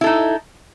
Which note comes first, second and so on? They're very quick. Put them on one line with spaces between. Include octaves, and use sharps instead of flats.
E4 A4 D#4